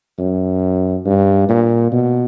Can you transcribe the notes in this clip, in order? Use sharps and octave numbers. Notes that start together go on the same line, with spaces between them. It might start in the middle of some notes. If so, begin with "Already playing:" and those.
F#2
G2
A#2
B2